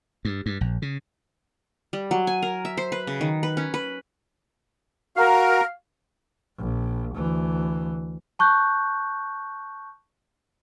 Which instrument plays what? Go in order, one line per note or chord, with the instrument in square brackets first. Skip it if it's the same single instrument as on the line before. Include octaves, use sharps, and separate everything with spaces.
[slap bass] G2
G2
A#1
C#3
[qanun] G3
F#3
G#5
A#4
E5
C5
B4
C#3
D#3
B4
C#4
B4
[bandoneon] F#4 [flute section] A#4 [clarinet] F5
[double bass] A#1
D2 E3
[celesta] A5 C#6 F#6 G6